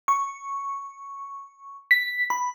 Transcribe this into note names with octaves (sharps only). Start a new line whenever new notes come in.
C#6
B6
B5